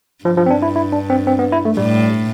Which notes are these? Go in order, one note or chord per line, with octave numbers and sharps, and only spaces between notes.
G2 F3
F3
C4
D4
E4
E4
D4
C4
C4
B3
E4
A3
A2 G3